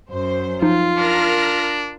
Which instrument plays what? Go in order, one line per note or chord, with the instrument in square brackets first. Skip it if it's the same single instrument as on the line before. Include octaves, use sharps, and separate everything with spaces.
[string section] F#2 C5
[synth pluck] F3 D#4 [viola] F4
[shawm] D4 [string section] A#4 F6 A#6